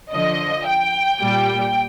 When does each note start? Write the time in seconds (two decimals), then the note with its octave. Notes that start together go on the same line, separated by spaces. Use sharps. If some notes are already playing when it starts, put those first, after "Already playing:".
0.12 D3 F3 D#5
0.66 G5
1.20 A#2 G3